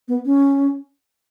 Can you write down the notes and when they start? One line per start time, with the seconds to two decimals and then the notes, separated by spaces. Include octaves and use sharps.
0.08 B3
0.25 C#4